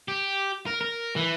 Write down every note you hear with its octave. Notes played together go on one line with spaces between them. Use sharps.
G4
A#4
A#4
E3